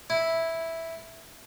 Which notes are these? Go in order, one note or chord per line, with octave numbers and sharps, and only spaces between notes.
E4